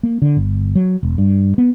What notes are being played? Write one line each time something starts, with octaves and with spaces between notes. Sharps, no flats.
A#3
D3
G1
F#3
E1
G2
B3